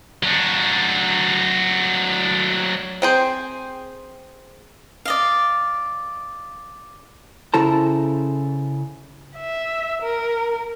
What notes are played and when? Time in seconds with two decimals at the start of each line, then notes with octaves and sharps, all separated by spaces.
0.23 F#3 D4
3.02 C4 G#4 C5
5.05 D5 D#5 F5
7.54 C#3 E4 A4 C5 A5 A#5
9.36 E5
10.02 A#4